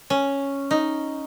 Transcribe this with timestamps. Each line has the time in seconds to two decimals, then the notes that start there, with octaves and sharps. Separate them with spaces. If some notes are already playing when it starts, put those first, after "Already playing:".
0.10 C#4
0.71 D#4